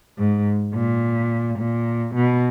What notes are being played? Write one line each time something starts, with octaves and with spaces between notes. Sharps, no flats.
G#2
A#2
A#2
B2